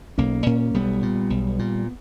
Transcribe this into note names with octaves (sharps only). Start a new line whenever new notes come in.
B1 A#3 C#4
A#2 A#3 C#4
B1 G3 B3
A#2
B1
A#2